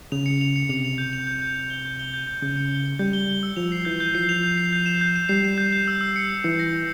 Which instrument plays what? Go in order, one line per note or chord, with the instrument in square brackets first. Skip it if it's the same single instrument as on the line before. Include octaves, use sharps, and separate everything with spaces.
[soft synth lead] C#3 [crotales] F7
[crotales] C#7
F7
C#7
[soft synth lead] C3 [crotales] F7
[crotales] F7
G6
F7
G6
G6
G6
G7
G6
G7
G6
G6
[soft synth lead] C#3 [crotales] G6
[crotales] C#7
G7
C#7
[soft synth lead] G3 [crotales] G6
[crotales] G7
G7
E6
[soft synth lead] F3 [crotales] F7
[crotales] C7
[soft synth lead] E3 [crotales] G6
[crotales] G6
[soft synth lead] F3 [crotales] C7
[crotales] F7
G6
C7
G6
E7
G6
E7
[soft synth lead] G3 [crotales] C7
[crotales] E7
G6
G6
E6
E6
C#7
E6
[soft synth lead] E3 [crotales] C#7
[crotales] A#6
C#7